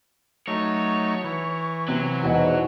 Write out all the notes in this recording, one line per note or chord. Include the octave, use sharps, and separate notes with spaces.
F#3 A3 D#4 C#5
E3
C3 F#3
E2 G#2 B2 F#4